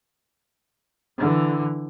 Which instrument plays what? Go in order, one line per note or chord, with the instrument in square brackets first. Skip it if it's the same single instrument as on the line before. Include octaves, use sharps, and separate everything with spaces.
[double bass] D3 E3